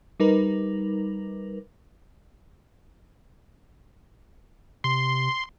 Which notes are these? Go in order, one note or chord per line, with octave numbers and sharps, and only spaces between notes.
G3 D#4 A#4 B4
C3 C6